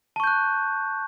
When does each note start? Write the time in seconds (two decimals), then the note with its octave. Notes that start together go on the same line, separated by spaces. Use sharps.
0.16 A5
0.20 C#6
0.24 G6
0.27 F#6